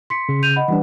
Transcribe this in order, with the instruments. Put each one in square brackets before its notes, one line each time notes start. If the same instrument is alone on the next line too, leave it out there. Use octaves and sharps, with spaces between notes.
[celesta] C6 B6 C#7
[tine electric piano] C#3
[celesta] G6 D#7 F7
D#5 F#5 B5
[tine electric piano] E3 G3 D4 [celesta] B4 F#5